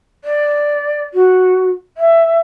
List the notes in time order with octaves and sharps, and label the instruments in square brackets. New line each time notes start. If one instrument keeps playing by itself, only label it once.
[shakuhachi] D5
F#4
E5